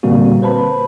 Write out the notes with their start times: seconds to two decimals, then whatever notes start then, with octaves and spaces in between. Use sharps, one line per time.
0.03 A#2 D3 G3 A#3 C4 F#4
0.42 B4 C5 A5 B5